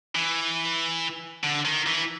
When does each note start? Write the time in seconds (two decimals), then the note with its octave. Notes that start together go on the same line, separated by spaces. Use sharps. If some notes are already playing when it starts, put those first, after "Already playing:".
0.15 E3
1.44 D3
1.65 D#3
1.87 E3